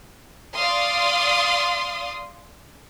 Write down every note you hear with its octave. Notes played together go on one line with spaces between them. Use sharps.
D5 F5 C6 D#6